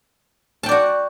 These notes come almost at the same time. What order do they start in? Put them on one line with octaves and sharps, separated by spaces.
A5 G5 D5 F#4